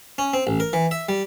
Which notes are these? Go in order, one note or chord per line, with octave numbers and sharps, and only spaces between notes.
C#4
C4
A1
A#4
E3
E5
G3